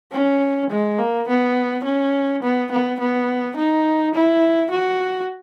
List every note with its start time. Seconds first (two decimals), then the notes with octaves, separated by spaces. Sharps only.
0.12 C#4
0.70 G#3
0.99 A#3
1.28 B3
1.84 C#4
2.43 B3
2.71 B3
3.00 B3
3.57 D#4
4.15 E4
4.71 F#4